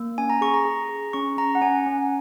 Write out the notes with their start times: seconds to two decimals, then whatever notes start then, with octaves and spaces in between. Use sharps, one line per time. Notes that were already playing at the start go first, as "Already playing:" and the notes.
Already playing: A#3
0.18 C#4 G#5
0.30 A#5
0.41 G#4 C#6
0.54 A#5
0.65 G#4
0.89 G#4
1.13 C#4 C#6
1.37 C#4 A#5
1.55 F#5
1.61 C#4 G#5
1.86 C#4